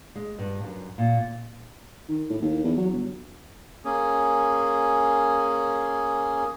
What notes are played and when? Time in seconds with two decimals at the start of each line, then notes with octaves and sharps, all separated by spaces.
0.15 G#3
0.39 G2
0.63 F#2
0.98 A#2
2.09 D#3
2.30 A2
2.41 D#2
2.64 E2
2.77 F#3
2.92 G1
3.85 A#3 C#4 G#4